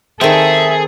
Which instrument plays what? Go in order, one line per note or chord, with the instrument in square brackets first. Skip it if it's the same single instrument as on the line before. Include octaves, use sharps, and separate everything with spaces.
[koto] D#3 C4 [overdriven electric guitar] G#4 [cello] A4 [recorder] E5